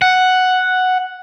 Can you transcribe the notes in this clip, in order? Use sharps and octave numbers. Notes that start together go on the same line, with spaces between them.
F#5